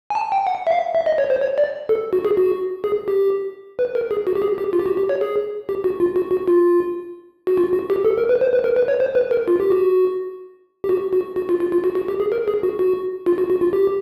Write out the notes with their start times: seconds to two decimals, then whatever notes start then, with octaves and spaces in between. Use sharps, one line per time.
0.10 G#5
0.15 A5
0.32 G5
0.47 F#5
0.67 E5
0.71 F5
0.95 E5
1.06 D#5
1.18 C#5
1.30 C5
1.41 C#5
1.58 D5
1.89 A4
2.13 F#4
2.25 G#4
2.37 F#4
2.84 G#4
3.08 G4
3.79 B4
3.95 A#4
4.11 G#4
4.27 F#4
4.35 G4
4.42 G#4
4.58 G4
4.73 F4
4.79 G4
4.86 F#4
4.97 G4
5.09 C#5
5.21 G#4
5.69 G4
5.84 F#4
6.00 F4
6.16 F#4
6.31 F#4
6.48 F4
7.47 F#4
7.58 F4
7.73 F#4
7.90 G4
8.05 A4
8.18 A#4
8.29 B4
8.41 C5
8.53 B4
8.64 A#4
8.76 B4
8.88 C#5
9.00 C5
9.15 B4
9.31 A#4
9.48 F4
9.60 G4
9.70 F#4
10.84 G4
10.89 F#4
11.13 F#4
11.36 F#4
11.49 F4
11.60 F4
11.72 F4
11.84 F#4
11.95 F#4
12.08 G4
12.20 G#4
12.32 A#4
12.48 G#4
12.63 F#4
12.79 F#4
13.26 F4
13.38 F#4
13.50 F#4
13.61 F4
13.73 G4